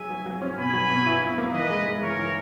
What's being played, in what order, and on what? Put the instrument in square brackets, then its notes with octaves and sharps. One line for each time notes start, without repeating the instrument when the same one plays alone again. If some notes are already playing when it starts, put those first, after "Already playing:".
Already playing: [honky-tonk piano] F#3 G#4 [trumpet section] E5 G#5
[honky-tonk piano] F#3
F#3
C#4
[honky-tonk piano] B2 [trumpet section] G#5 B5
[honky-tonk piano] F#3
B2
E4
E4
A#3
[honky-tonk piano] E3 [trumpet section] B4 D#5
[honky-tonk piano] G#3
G#3
[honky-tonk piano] E3 [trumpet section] A#4 C#5
[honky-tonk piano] E3